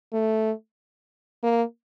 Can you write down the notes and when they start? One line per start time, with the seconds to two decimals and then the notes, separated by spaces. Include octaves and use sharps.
0.13 A3
1.43 A#3